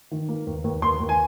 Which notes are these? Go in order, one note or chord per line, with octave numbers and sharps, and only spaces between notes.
D#3
A#3
D#2
D#2
D#2 C6
D#2
G#5